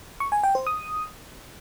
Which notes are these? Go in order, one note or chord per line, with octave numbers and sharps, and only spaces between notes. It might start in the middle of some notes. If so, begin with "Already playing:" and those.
C#6
G#5
G5
C5
D#6